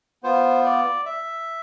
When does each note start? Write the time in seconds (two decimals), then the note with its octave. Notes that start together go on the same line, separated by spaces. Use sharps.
0.23 B3 F4 C5
0.65 D5
1.06 E5